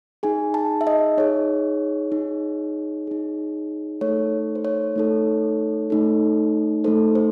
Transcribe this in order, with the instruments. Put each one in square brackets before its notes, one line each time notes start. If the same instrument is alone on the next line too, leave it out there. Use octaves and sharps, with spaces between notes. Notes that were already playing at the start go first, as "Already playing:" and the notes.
[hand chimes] D#4 G#4 G#5
A5
E5
D#5
D#4 G#4 C#5
D#4 G#4
D#4 G#4
A3 D#4 A4 C#5
C5
C#5
A3 D#4 A4
A3 D#4 A4
A3 D#4 A4 C5
C5